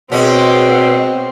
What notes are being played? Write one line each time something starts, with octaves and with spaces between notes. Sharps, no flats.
B2 G#3 C4 C#4